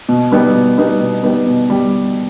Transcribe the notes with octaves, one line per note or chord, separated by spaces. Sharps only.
B2
G3 B3 D#4
B2
G3 B3 D#4
B2
G3 B3 D#4
B2
G3